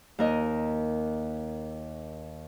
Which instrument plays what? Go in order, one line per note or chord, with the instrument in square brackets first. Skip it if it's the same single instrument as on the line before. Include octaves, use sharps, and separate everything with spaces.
[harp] D#2 A#4 D#5